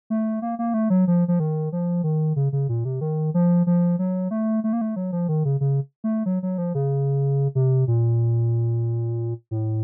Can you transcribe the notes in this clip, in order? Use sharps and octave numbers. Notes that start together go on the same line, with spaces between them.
A3
A#3
A#3
A3
F#3
F3
F3
D#3
F3
D#3
C#3
C#3
A#2
C3
D#3
F3
F3
F#3
A3
A3
A#3
A3
F#3
F3
D#3
C#3
C#3
A3
F#3
F#3
F3
C#3
C3
A#2
A2